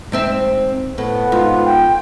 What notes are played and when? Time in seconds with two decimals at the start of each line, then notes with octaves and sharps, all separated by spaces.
0.12 G#2 C4 E5
0.98 A2 B3
1.32 G#2 F4 B4
1.64 G5